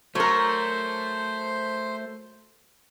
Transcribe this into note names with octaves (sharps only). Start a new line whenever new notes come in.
F#3 A3 A#4 C5